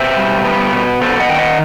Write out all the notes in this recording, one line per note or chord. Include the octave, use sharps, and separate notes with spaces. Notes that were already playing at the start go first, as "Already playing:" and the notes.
Already playing: B2 C5 E5
G3
B3
B2
B3 A4 C5
D#5 F#5
D#3 G5
D#5 F#5